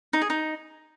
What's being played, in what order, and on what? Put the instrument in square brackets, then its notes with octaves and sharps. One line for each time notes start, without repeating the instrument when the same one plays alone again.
[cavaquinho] D#4
G#4
D#4